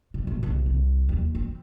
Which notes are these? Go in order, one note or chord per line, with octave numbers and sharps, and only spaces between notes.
C3
A1
C2
C2
D#2
C4